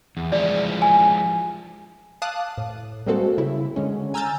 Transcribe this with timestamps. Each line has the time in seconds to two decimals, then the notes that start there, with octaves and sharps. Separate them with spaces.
0.17 E2
0.32 F3 G#3 E4 D5
0.82 G#5
2.22 F5 A5 D6 D#6 F#6
2.58 A2
3.07 G3 G#3 A#3 C4 F#4 A4
3.38 C#3 E4
3.76 D3 G#3 C#4
4.14 G#5 A#5 E6 F6 G6 A6